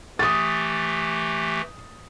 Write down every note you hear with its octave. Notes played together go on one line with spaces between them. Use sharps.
E3 A3 G4 D#6 A6